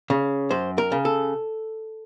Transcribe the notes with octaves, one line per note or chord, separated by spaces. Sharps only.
C#3
F#2 C5
A#4
C#3
A4